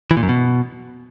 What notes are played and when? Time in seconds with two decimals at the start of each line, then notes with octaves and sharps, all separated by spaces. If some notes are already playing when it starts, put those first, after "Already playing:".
0.11 E3
0.17 A#2
0.23 F#2
0.29 B2